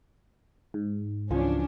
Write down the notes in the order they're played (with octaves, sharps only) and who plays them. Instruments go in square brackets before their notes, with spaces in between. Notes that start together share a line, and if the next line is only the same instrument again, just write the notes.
[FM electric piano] G#2
[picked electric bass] C#2 E3 [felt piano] F3 [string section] C#4 D4